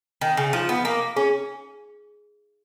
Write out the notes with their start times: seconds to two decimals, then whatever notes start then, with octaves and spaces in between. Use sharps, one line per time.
0.21 D#3 G#5
0.37 C#3
0.53 F3 D#4
0.69 B3
0.84 A#3 G#5
1.16 C#4 G#4